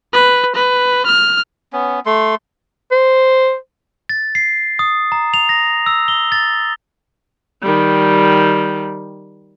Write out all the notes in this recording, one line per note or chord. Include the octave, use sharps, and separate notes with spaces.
B4
B4
F6
B3 C#4
A3 C6
C5
A6
C7
D#6
A#5
F7
A#6
E6
G7
A6
D#3 G3